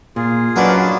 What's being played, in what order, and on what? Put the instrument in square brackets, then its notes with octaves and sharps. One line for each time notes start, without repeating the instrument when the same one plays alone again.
[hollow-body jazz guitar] A#2 [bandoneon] F4 G#4
[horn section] F#2 D4 F#4 [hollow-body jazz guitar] F#3 [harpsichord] D#4 A#4 B4